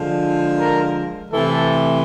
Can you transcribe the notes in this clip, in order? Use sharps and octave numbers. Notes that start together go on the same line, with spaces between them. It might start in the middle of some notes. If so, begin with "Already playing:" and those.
Already playing: D3 F3 G#3
A#4
C3 E3 A3 A4